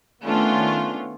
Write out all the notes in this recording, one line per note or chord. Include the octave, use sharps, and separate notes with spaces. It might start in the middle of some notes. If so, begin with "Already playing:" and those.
D#3 A3 B3 C#4 D4 F4